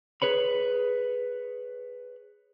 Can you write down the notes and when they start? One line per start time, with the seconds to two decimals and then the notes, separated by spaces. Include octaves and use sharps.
0.22 G#4 B4 C#5 B5